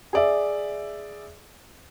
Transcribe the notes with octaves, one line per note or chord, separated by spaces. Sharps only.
G#4 D5 E5